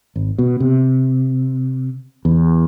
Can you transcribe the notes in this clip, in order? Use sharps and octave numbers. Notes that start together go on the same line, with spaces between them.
G#1
B2
C3
E2